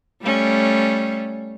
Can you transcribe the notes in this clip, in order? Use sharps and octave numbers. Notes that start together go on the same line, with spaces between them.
G3 A3 C#4